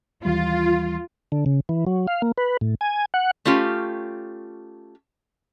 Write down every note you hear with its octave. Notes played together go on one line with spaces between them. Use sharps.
D#2 E3 G3 F4
D3
C#3
E3
F#3
F5
A#3
B4
A2
G#5
F#5
A3 C#4 F4 G4